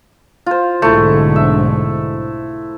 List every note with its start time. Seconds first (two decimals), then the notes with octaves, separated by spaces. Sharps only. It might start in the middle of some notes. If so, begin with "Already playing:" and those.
0.46 F4 C5
0.82 B1 G#2 D3 A3 E4
1.36 E5